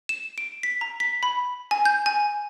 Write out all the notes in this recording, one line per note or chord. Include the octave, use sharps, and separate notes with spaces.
E7
D7
B6
A#5
B6
B5
G#5
G6
G#5